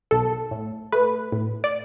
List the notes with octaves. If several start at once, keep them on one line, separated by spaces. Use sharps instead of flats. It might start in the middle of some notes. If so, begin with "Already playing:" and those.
B1 A4
A2
A3 B4
A2
D5